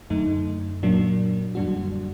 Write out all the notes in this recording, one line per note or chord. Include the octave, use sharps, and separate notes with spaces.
F#2 D3 A3 D#4
A#2 F#3 A#3 D4
F#2 D3 G3 D4 F#4